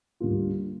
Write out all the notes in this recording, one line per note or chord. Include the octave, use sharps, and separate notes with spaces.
D2 D3 G3 A#3 F4